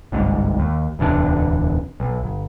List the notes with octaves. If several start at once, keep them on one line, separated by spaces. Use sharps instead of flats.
G1 C2 G#2
D#2
D1 E2 C3 D4
B1
G1